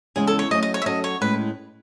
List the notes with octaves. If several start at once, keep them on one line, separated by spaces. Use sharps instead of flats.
E2 C#3 G#3 C#4 G#4
A4
C#5
F#3 A3 C#4 D#5
D#5
C#5
E5
F#3 C#4 F#4 A4 D#5
C#5
A2 G#3 C#4 B4